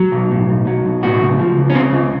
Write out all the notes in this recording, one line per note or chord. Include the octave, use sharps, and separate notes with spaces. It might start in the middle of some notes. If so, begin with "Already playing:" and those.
Already playing: F#3
B1
A2
B1
F#3
B1
A2 F#4
C#2
F3
C#2
C#4
C#3 C4
C#2